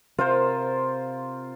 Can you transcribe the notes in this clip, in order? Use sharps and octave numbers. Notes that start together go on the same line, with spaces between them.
C3 F4 A#4 C5